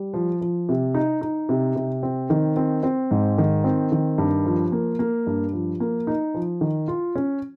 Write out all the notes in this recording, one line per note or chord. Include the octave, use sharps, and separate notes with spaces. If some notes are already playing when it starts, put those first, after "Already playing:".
Already playing: G3
F3
F3
C3
D#4
D#4
C3
C3
C4
D#3
C4
C4
G#2
D#3
C4
D#3
G2
F3
A#3
A#3
G2
F3
A#3
D#4
F3
D#3
F4
C#4